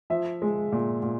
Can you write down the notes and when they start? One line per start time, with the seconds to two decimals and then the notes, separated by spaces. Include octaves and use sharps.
0.10 F3 E5
0.42 G#3
0.72 A#2
1.03 A#2